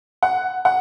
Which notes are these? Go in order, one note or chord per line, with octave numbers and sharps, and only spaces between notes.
F#5
F#5